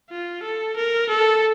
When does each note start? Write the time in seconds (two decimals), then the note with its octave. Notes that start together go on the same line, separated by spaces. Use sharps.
0.10 F4
0.43 A4
0.76 A#4
1.09 A4